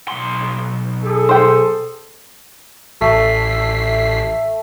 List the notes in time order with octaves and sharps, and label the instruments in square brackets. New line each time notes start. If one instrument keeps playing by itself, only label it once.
[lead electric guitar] B1 C6
[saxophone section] G#4 A4
[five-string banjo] C5 G5
[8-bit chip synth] A1 B6 C7 [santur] A3